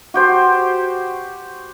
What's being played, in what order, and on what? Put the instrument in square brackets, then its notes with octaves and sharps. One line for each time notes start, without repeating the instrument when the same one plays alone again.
[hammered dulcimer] F#4 G4 C5